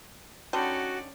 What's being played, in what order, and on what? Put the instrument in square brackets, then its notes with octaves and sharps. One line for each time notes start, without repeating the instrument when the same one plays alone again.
[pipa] D3 G3 D#4 [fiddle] C#4 D5 [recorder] F#4